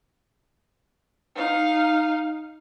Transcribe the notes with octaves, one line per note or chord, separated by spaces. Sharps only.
D#4 F5